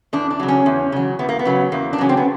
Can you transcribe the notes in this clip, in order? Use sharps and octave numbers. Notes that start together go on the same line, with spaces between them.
E2 D4
D4
C#3 F#3
C#4
E2
C#3 F#3
E2 B3
A#3
B3
C#3 F#3
E2 A#3
D4
C#3 F#3 C#4
C4
B3